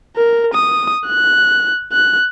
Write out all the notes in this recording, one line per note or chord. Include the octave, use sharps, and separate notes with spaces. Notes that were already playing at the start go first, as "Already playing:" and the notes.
A#4
D#6
F#6
F#6